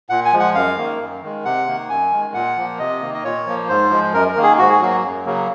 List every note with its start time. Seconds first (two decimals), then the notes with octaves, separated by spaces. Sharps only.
0.09 A#2 F#5
0.25 G#5
0.33 F3 G#3
0.40 F#5
0.55 F#2 F5
0.77 D#3 A#3
0.99 F#2
1.23 D#3 G#3
1.45 C3 F#5
1.67 D#3 A#3
1.89 F#2 G#5
2.12 D#3 G#3
2.34 A#2 F#5
2.57 F3 A#3
2.79 C3 D#5
3.01 D#3 A#3
3.14 D#5
3.24 A#2 C#5
3.47 F3 A#3
3.68 G#2 C5
3.90 F3 G#3
4.13 F#2 A#4
4.29 A#4
4.36 D#3 A#3
4.43 G#4
4.58 G#2 F#4
4.69 G#4
4.81 F#3 A#3 F#4
5.03 F#2
5.26 C#3 F#3 A#3